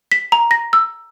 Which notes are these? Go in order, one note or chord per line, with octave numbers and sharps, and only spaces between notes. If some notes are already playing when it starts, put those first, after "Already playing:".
B6
A#5
A#6
E6